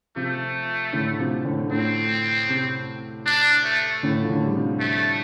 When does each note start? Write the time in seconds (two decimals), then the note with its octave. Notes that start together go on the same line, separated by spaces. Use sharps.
0.16 C3 F3 A3
0.93 A2 D3
1.19 C3 F3
1.45 A2 D3
1.71 A2 C4
2.49 C3
3.26 D4
3.64 A3
4.03 A2 D3
4.22 F3
4.29 A2 D3
4.46 G3
4.55 C3 F3
4.80 A3